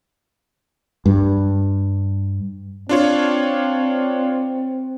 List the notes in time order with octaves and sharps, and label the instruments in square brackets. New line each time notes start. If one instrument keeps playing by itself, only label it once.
[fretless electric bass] G2
[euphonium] C4 [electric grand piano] D4 F4 C#5